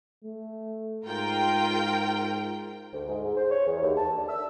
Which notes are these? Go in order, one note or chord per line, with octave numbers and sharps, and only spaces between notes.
A3
G#2 F4 A#4 G5
D2
G#2
G#2
C5
C#5
E2
D#2
A5
D3
E6